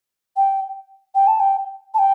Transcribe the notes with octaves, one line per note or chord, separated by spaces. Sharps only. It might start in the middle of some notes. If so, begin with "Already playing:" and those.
G5
G5
A5
G5
A5
G5